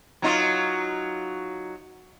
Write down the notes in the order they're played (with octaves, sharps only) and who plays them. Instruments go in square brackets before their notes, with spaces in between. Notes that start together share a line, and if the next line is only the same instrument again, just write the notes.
[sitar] F#3 D#4 F4